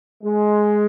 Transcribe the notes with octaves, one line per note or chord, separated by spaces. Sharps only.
G#3